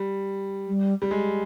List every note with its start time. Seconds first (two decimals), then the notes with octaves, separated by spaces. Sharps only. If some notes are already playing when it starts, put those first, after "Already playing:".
Already playing: G3
0.68 G3
1.02 G3
1.11 G#3